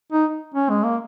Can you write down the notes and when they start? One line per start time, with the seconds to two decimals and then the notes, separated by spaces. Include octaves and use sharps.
0.12 D#4
0.55 C#4
0.70 G#3
0.83 A#3